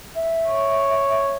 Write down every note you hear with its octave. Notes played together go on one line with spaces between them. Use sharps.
E5
C#5